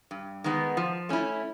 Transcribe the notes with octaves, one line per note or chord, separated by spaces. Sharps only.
G2
D#3 G#3 B3
F3
A3 C#4 E4